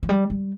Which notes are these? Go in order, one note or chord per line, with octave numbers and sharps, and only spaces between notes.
F3
G3
G3